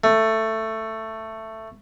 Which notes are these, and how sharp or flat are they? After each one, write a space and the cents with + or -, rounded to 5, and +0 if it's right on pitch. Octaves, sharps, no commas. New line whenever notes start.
A3 +10